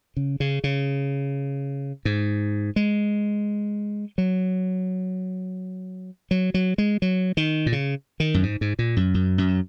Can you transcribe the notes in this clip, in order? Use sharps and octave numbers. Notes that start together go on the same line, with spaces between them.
C#3
C#3
C#3
G#2
G#3
F#3
F#3
F#3
G#3
F#3
D#3
A#2
C#3
D#3
F#2
G#2
G#2
A#2
F#2
F#2
F#2